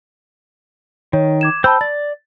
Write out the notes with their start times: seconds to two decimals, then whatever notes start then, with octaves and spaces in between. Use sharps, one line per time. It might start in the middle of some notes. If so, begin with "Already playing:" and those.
1.13 D#3 C#5
1.41 D6 G#6 E7
1.64 C5 G5 A5 B5 E6 G6
1.81 D5 A6